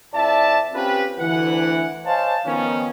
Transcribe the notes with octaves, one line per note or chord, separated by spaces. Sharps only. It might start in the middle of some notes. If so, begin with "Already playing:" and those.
F2 E4 D5 E5 A5
C4 C#4 F4 G4 B4
D2 E3 F#5
C5 C#5 D#5 F5 G#5 A5
D#3 F3 B3 C#4